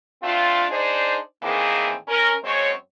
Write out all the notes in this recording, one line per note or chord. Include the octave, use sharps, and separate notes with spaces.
A3 C4 D4 F4
D4 D#4 G#4 C5 D5
A2 D#3 E3 A#3 C4 G#4
C#4 A#4
F#2 G#3 C4 C#5